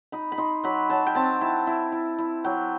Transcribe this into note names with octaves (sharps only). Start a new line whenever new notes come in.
D#4 B5
B5
D#4 C6
F#3 B5
F#3 A5
G5
C4 A5
E4 A5
E4
E4
E4
F#3 G5